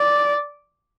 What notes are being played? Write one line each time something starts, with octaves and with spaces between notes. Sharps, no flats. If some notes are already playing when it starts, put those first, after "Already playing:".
Already playing: D5